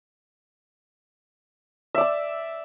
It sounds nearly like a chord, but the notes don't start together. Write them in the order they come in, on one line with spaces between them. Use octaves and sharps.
E5 D5 E6